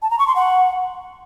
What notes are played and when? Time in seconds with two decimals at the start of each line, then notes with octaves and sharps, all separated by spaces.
0.02 A5
0.10 A#5
0.19 C#6
0.27 C6
0.35 F#5